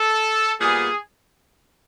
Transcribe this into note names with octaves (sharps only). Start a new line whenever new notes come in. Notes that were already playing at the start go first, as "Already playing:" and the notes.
Already playing: A4
A#2 G3 B3 G#4